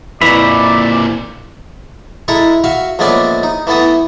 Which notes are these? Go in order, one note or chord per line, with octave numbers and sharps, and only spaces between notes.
F2 A#2 E3 D5 E5 A#5 B5 C#6
G#3 E4 A4 A#5 C#6
F#4 E5 F5 C#6
A#1 G#3 A3 B3 C#4 D5
D#4
E3 A3 B3 A4 D#6